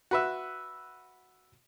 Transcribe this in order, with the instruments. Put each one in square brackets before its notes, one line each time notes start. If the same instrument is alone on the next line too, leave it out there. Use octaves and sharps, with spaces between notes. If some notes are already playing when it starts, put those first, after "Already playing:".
[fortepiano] F#4 B4 E5